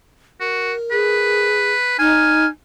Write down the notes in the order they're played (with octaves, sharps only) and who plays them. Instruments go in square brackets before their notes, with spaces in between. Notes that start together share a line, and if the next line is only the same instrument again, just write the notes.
[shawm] F#4 [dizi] A#4
[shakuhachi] G#4 [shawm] B4
[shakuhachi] D#4 [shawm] G#5 [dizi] F6